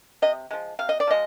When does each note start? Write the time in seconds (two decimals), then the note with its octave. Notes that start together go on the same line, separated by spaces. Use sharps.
0.22 C3 D#5
0.51 F3 G#3
0.79 C3 F5
0.89 D#5
1.00 D5
1.07 F3 G#3 D#5